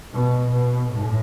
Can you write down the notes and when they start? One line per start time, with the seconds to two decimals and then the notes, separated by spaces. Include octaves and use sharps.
0.14 B2
0.52 B2
0.92 A2